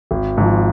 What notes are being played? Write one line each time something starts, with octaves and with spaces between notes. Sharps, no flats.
G#1
G#2 F3